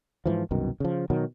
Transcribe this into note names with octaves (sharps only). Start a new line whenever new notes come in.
G#2 E3 F3
C2 F#2 B2 D#3
C#3 F3
B2 D#3 F#3